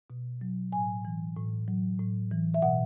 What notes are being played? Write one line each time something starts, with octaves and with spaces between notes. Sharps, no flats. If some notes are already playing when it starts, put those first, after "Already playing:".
B2
F#3
A2 G#5
E3
A2
F#3
A2
E3
E5
B2 F#5